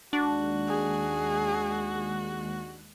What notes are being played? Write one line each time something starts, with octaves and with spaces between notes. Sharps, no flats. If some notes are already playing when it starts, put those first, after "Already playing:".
D#2 G#3 D4 F#4 F#6
G#4